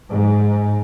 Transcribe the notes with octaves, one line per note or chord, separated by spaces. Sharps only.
G#2